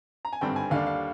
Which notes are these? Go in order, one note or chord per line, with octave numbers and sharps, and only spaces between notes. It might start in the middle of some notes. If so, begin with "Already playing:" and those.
A#5
G#5
G#1 G2 D3 G3 C4 G5
G#5
D#2 D3 G3 D4 F5
F5